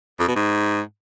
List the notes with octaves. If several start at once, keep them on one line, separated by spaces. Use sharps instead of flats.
F2
B2
G#2